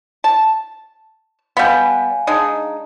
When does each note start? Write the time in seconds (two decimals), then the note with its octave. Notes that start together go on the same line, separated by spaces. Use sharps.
0.24 A5
1.57 G3 B3 F5 G#5
2.27 G#3 D4 D#4